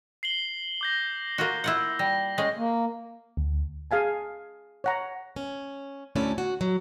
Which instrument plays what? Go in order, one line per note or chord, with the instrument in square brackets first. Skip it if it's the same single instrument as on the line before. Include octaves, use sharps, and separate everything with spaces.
[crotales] C7 F#7 G7
D6 G6 A#6
[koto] A#3 F4 F#4
E4 F4 F#5
[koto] G3 [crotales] A#6
[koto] G#3 C#4 [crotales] A#6
[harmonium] A#3
[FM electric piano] D2
[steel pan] G#4 F5 G#5 A5
C#5 F#5 A#5
[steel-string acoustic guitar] C#4
D2 A3 C#4 E4 A4 D5
F#4
F#3